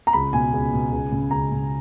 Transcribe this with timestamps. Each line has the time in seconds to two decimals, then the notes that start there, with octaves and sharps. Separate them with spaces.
0.07 A#5
0.13 C#2 B5
0.33 B2 G#5
0.53 C#2
0.73 B2
0.92 C#2
1.12 C#3
1.31 C#2 A#5
1.51 C#3